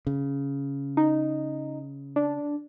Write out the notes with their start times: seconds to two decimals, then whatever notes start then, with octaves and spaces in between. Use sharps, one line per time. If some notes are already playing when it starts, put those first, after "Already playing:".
0.07 C#3
0.97 D#4
2.16 D4